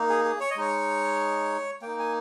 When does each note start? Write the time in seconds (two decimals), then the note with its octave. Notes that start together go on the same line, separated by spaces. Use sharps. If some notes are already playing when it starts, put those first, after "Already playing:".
Already playing: A#3 D#4
0.09 G#4
0.25 G#4
0.40 C#5
0.50 D#5
0.56 G#3 D#4 C#5
1.82 A#3 D#4 G5
1.99 G#5